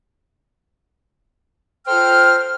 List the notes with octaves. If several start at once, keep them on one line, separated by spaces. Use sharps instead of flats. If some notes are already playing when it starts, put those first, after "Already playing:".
F4 A4 C5 G5 F6